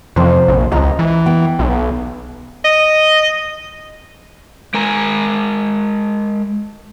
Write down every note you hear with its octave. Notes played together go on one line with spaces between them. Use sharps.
F2 C3 F3 C5
A#1
C#2 D#5 A#5
E3
B3 G5
B1
D#5
G#3 A#4 G#5 A#5